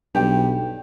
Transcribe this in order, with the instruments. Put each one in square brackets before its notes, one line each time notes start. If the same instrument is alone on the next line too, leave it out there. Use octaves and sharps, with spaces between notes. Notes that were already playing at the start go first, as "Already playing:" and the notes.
[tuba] B1 [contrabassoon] G2 [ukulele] G4 G5